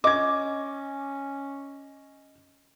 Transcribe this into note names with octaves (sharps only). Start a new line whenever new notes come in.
C#4 D#5 D6 G#6